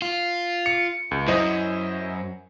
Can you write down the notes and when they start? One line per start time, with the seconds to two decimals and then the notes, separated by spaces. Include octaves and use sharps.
0.02 F4
0.66 C#7
1.11 C#2
1.28 F#2 E4 C5 D#5